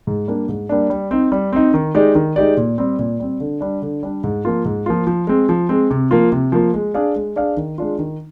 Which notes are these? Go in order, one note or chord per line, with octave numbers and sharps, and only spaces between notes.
G#2
G3 A#3 D4
G#2
G3 A#3 D4
G3
C4 D#4
G3
C4 D#4
D#3
G#3 D#4 G4 D5
D#3
G#3 D#4 G4 D5
A#2
G3 C4
A#2
G3 C4
D3
G3 D4
D3
G3 D4
G#2
F3 A#3 F4
G#2
F3 A#3 F4
F3
G#3 C4
F3
G#3 C4
C3
F3 A#3 F4
C3
F3 A#3 F4
G#3
D4 G#4 D5 F5
G#3
D4 G#4 D5 F5
D#3
G#3 D4 F4
D#3